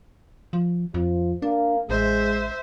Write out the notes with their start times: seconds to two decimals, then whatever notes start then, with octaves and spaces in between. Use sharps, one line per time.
0.53 F3
0.94 F2 F3
1.42 A#3 D4
1.89 A1 G#3 C5 E5